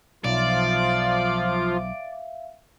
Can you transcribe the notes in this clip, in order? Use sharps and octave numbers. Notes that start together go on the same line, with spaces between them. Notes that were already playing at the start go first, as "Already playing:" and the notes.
B1 F3 F4 D5 E5 F5